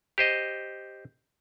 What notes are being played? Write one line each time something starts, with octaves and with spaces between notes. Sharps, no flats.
G4 C5 D#5